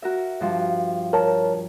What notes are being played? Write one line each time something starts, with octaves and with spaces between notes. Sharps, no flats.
F#4 A#4 E5
G2 F3 G3
A#4 C#5 A5